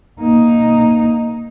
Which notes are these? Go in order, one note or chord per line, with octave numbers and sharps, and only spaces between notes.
A#3 D#4